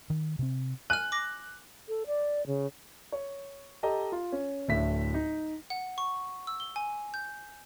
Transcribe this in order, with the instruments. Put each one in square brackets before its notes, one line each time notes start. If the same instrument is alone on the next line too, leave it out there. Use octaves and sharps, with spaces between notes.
[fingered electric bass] D#3
C3 C4
[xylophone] G#5 F6 [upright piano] F#6
[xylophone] D6 A#6
[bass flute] A4
D5
C#3
[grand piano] C#5
G4 A4 D#5 A#5
F4
C#4
D1 A2 D4 E5 B6
D#4
[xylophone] F#5
C#6
E6
G7
G#5
G6